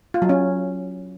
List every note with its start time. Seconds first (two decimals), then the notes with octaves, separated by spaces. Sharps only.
0.14 F4
0.22 F#3
0.29 C#4